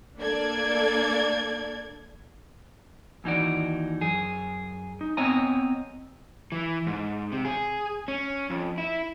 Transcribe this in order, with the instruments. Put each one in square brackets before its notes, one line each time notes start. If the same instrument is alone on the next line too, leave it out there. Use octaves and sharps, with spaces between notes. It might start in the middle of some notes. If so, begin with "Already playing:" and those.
[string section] A#3 D4 A4 D5 G#6
[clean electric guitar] D#2 E3 D#4 F#4 D5
F#2 G#4
D#4
B3 C4 C#5 D#5 G#5 A#5
[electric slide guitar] E3
G#2
C3
G#4
C#4
F2
E4